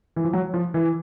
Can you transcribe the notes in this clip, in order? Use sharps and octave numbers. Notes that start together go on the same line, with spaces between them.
E3
F3
F#3
F3
E3